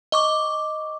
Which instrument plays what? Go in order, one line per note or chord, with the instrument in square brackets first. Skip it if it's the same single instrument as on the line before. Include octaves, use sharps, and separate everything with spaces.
[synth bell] D#5 C#6 D6